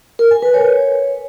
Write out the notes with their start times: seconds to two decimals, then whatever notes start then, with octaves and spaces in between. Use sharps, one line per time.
0.19 A#4
0.31 G#5
0.42 B4
0.54 C#5